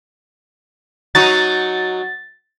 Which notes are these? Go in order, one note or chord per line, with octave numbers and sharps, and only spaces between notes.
F#3 D#4 F#4 A6